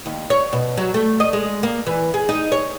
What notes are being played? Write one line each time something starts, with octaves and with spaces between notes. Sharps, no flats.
D#2
C#5
B2
F#3
A3
D#5
G#3
A#3
E3
G#4
D#4
C#5